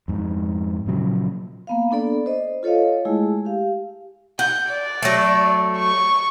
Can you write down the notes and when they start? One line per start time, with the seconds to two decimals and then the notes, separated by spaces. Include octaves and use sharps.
0.08 F2 G#2
0.87 A#2 C#3 F3 F#3
1.67 A#3 B3 F5
1.91 B3 D4 A4 D5
2.26 C5 D#5
2.63 F4 A4 C#5 D#5 F5
3.05 G#3 A3 E4 G#4
3.45 G4 F5
4.39 F#5 G6
4.69 D5
5.02 F#3 A3
5.78 C#6